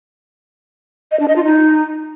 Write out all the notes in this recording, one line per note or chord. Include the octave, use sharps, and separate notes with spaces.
D#5
D4
D#5
F4
D#4